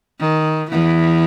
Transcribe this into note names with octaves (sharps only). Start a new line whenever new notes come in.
D#3
E2 E3